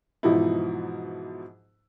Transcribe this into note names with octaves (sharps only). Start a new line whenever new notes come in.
G#2 B2 E3 F3 D#4 E4